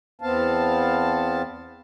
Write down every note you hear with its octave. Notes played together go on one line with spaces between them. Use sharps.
E2 B3 C4 F5 A5